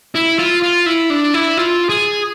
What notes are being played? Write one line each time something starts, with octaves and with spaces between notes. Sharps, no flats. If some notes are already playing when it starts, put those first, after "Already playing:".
E4
F4
F4
E4
D4
E4
F4
G#4